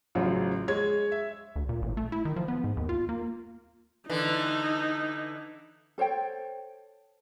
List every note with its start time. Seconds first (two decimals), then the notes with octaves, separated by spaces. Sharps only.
0.15 A1 C#3 F3 F#3
0.68 G#3 C#5 G#6
1.12 E5
1.56 D2
1.69 A#2
1.82 A1
1.97 A3
2.12 E4
2.25 D#3
2.36 F3
2.48 B3
2.64 G#2
2.77 D#2
2.89 F4
3.09 A#3
4.10 D3 E3 D#4
5.98 A4 C5 C#5 G5